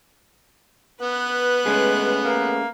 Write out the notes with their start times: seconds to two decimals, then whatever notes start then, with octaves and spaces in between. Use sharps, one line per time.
1.03 B3 B4 F#6
1.66 G#3 A3 C#4 G#4
2.24 A#3